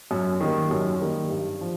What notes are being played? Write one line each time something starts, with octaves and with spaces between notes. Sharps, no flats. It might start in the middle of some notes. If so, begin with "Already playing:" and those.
F#2
D#3 G3 A#3
F#2
D#3 G3 A#3
G2
F3